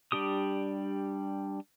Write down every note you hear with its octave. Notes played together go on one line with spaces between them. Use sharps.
G3 D4 G4 D#6